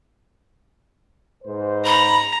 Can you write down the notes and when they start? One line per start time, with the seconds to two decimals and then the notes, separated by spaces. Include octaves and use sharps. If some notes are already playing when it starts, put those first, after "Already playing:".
1.44 G#2 B4 C5
1.86 A#5 B5